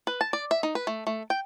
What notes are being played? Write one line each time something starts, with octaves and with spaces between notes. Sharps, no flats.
B4
A5
D5
E5
D#4
B4
A3
A3
G5